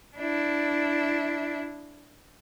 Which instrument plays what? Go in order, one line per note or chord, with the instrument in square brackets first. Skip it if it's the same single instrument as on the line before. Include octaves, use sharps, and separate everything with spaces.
[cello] D4 E4